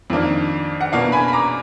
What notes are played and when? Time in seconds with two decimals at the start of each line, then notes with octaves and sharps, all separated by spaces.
0.10 F2 D#3 A#3 D4
0.81 F#5
0.92 B2 A#3 D4 F5
1.12 G#5 B5
1.28 B5
1.33 A#5 D6